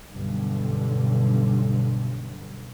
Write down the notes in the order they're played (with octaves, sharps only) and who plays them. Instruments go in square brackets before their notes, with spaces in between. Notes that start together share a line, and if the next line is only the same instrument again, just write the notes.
[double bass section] B1 G2 B2 D3